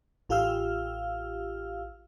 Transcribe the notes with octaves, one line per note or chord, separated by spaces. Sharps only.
A1 F4 G4 F5 E6 F6